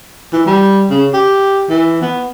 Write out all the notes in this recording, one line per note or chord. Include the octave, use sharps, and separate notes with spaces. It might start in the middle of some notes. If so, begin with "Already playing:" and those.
E3
G3
C#3
G4
E3
B3